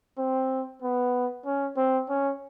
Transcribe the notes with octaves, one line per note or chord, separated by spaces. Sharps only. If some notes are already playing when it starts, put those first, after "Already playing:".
C4
B3
C#4
C4
C#4